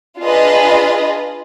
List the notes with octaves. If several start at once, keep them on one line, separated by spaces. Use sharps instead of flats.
D4 F4 G#4 B4 D#5